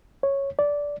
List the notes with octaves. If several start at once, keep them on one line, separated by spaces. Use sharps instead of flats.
C#5
D5